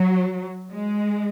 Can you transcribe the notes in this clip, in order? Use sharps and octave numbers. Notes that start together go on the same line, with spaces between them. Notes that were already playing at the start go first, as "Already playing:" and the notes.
Already playing: F#3
G#3